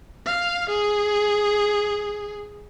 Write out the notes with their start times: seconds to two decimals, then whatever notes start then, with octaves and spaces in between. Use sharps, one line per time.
0.26 F5
0.69 G#4